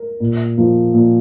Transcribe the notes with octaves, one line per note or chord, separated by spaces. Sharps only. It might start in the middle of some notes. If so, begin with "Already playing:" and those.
Already playing: A#4
A#2
F3 A#3
A#2